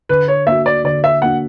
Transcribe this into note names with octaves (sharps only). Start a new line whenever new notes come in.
D3 B4
C#5
A#3 D4 F#4 E5
D5
D3 D5
E5
A#3 D4 F#4 F#5